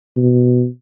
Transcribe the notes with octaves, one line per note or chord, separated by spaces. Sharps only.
B2